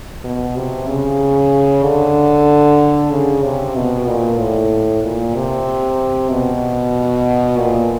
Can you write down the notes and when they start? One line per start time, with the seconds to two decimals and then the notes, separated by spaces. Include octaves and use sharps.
0.24 B2
0.56 C3
0.87 C#3
1.83 D3
3.11 C#3
3.43 C3
3.75 B2
4.07 A#2
4.38 A2
5.02 A#2
5.35 C3
6.31 B2
7.58 A#2